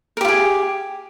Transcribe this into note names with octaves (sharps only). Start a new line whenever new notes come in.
F4 G4 G#4 A#4